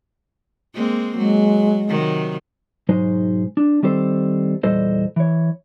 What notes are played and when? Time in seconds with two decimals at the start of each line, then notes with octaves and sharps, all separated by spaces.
0.75 G#3 A#3 C4
1.18 F#3 G#3
1.88 C3 D#3 F#3
2.89 B1 G#2 F#3 G#3 D#4 C5
3.57 D4
3.83 D#3 G3 C4 A4 C5
4.63 E2 A#2 G3 A4 C5 D#5
5.16 E3 C#5